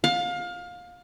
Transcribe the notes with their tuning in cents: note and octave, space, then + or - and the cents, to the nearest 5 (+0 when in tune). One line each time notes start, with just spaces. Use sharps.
F5 +25